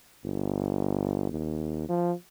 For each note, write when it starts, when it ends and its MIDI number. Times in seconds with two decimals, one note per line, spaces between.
0.25 1.30 31
1.31 1.87 39
1.89 2.12 53